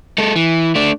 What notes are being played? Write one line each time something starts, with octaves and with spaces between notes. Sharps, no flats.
G#3 A4
E3
A3 D4